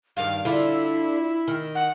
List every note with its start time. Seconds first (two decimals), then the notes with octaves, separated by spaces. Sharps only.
0.17 G2 D#3 F5
0.45 D3 E4 F4
1.48 D#3
1.75 F#5